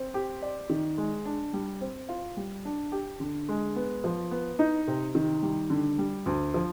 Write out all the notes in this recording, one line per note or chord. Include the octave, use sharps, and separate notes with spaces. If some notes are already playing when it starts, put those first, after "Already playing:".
Already playing: C4
G4
D5
D#3
G#3
D4
G3
C4
F4
G3
D4
G4
D3
G#3
B3
F3
B3
D#4
C3
D#3
G3
D3
G3
D2
F3